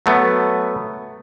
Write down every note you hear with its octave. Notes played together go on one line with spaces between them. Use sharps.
F#3 A3 B3